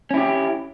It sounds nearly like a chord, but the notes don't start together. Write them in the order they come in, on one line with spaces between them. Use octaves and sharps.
C#4 E4 G4